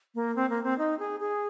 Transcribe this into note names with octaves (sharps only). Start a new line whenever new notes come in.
A#3
C4
A#3
C4
D#4
G#4
G#4